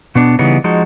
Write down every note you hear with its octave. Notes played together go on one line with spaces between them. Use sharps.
B2 B3 D4
C#3 E3 G3 B3 D#4
F3 G#3 D#4 F#4